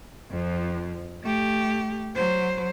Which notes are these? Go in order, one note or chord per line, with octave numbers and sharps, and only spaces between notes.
F2 F3
A3 G4
F#3 C5